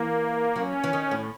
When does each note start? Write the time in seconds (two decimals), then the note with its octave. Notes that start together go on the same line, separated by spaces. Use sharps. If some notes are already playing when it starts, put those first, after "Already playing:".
Already playing: E3 A#3
0.56 F#3 C#4
0.84 E3
0.93 D#3
1.11 A2